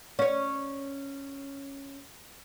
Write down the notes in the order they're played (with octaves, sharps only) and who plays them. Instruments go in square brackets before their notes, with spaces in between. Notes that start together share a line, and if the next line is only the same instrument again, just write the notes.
[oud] C#4 C#5